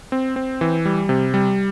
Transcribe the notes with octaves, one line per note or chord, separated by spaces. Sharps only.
C4
C4
E3
G3
C3
G3